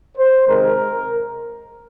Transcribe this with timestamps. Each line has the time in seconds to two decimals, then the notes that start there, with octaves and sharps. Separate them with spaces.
0.18 C5
0.48 C3 D#3 G#3 A#4